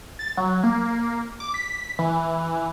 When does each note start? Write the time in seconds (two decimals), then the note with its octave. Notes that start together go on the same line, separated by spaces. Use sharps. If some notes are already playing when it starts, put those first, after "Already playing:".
0.19 A6
0.37 F#3
0.64 A#3
1.40 D6
1.54 B6
1.99 E3